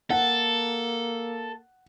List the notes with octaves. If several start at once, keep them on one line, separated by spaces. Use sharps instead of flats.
A#3 A4 F#5